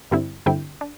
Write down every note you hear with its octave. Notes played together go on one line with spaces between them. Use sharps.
G2 D3 G3 C4 E4
G2 D3 G3 C4 E4 G5
D4